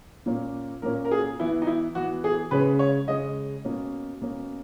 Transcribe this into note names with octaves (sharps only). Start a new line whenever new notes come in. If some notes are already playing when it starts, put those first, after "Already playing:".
A#2 A#3 C#4
A#2 A#3 C#4 A#4
A#4
G#4
E3 B3 E4
D#4
E4
E3 B3 F#4
G#4
C#3 G#3 C#4 B4
C#5
C#3 G#3 C#4 D#5
B2 A#3 C#4
B2 A#3 C#4